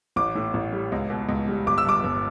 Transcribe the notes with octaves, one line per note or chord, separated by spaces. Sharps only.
A1 D6
A2
A1
G3
C#2
B2
C#2
G3
G1 D6
E6
G2 D6
G1